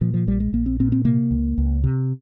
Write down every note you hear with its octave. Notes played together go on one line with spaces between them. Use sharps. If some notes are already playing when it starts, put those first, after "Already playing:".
A#2 F3
F3
A#1 G3
G#3
A#1 A#3
C4
A#2 C4
C4
C3 A#3
C#2
C#2
C3